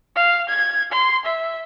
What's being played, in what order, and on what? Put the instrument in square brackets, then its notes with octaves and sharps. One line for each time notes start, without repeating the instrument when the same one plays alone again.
[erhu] F5
G#6
C6
E5